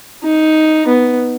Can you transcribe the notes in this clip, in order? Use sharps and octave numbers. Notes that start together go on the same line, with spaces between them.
D#4
B3